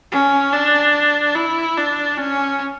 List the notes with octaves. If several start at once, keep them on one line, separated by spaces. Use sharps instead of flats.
C#4
D4
E4
D4
C#4